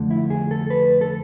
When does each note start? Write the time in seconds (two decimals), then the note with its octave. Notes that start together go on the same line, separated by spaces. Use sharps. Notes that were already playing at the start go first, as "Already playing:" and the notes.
Already playing: F2 D3 A3
0.10 E4
0.30 G#4
0.51 A4
0.70 B4
1.01 A4